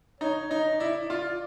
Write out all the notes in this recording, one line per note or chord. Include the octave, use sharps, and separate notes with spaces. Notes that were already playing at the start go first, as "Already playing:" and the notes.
D#4 C#5
D#4 D#5
E4 D5
F4